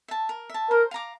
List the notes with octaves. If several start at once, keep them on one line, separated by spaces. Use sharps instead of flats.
E5 A5
A#4
E5 A5
A#4 C5
F5 A#5 D6